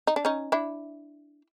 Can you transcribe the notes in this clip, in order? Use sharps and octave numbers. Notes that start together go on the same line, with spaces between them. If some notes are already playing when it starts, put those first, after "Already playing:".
D#4
D4
C#4 D#4
D4 E4